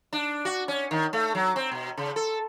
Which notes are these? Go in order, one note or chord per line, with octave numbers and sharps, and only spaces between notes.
D4
F#4
C#4
D#3
A3
F#3
C4
B2
C#3
A4